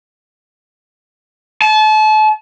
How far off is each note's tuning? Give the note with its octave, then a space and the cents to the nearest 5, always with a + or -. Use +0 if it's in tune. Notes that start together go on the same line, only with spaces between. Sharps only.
A5 -35